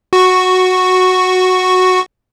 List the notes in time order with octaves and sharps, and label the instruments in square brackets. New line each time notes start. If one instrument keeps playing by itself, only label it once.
[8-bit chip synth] F#4 C#6